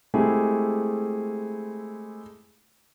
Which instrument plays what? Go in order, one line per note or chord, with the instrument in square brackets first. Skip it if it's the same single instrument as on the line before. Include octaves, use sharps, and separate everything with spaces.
[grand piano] G#3 A3 C4 E4 G4 G#4